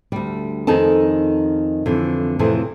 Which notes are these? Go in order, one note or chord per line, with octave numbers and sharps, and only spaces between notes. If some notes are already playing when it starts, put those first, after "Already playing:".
D2 G3
F2 D#3 D#4 G#4 A4 A5
F2 D3 E3
F2 A2 C3 E3 G#4 A4